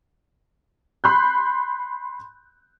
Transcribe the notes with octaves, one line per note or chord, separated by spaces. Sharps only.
B5 C6 F#6 G6